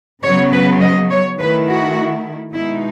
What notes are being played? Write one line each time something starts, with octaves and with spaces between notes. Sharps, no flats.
C#3 F#3 B3 C#5
B4
D#5
C#5
D#3 A3 E4 B4
F#4
B2 G#3 D#4 E4